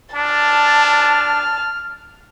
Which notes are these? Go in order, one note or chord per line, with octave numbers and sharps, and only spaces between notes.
D4 A5 F6